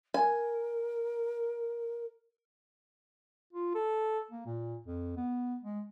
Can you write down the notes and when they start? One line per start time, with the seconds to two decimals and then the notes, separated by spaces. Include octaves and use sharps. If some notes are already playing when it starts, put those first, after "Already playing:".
0.14 A#4 G#5
3.53 F4
3.75 A4
4.31 A#3
4.46 A#2
4.87 F2
5.17 B3
5.63 G#3